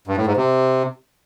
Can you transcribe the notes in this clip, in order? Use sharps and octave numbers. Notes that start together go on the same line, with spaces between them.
G2
A2
G#2
C3